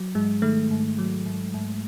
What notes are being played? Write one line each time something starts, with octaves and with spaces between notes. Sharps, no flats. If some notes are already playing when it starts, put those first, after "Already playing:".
Already playing: F#3
G#2 G#3
D#3 A3
G#2
F#3
G#2
G#2